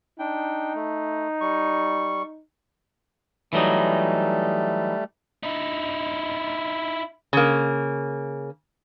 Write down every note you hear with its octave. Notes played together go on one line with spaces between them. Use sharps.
D4 D#4 G5
A3
G3 C#6
E3 F#3 G3 A3 D#4
D#4 E4
C#3 A#3